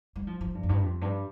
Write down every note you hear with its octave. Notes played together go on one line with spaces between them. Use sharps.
G3
F3
F3
G2
F2
G2
F2
G2